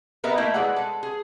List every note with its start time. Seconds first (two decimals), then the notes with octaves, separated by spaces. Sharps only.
0.24 B3 A#4 B4 D#5 E5
0.37 A3 A#3 E4 A#4 E5 F5
0.54 G#3 G#4 B4 D5 F#5
0.76 G#3 A4
1.03 G#4